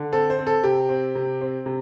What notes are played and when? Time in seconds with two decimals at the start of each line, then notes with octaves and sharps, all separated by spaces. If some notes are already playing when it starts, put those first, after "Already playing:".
Already playing: D3
0.12 C4 A4
0.30 C5
0.39 C4
0.47 A4
0.64 C3 G4
0.89 C4
1.15 C3
1.41 C4
1.66 C3